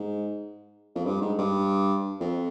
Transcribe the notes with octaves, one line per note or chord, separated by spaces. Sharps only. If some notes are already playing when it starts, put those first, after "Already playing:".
Already playing: G#2
F2
G2
G#2
G2
F2